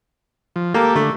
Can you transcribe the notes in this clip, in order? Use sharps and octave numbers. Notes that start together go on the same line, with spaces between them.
F3
A#3 G4 A4
D3 A3